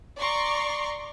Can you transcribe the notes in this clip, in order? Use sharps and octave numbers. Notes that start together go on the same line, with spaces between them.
D5 A#5 C6 C#6